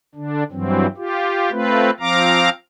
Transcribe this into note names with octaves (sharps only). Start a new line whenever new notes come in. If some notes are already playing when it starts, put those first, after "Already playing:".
D3 D4
G2 E3 F#3 C4
F4 G4
A3 C4 F4 B4
F3 C4 F5 A#5 D6